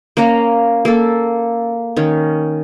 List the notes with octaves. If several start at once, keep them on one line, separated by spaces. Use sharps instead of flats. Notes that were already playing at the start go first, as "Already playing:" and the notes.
A#3 C#4 F5 A#5
A#3 A4
D#3 C#4